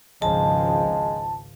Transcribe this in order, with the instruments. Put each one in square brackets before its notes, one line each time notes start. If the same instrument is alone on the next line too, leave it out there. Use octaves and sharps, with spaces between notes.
[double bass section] G#1 C#2 F3 [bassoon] G#3 [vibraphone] A5